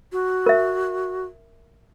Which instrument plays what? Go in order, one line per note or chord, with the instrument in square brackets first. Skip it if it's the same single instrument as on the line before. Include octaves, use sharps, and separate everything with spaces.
[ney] F#4
[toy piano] A#4 E5